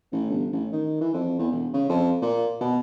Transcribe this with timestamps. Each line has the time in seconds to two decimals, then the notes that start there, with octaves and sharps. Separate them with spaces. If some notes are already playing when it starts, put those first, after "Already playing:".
0.12 A1
0.30 G1
0.52 A1
0.72 D#3
1.01 E3
1.14 F2
1.39 E2
1.52 E1
1.74 C#3
1.89 F2
2.22 A#2
2.61 B2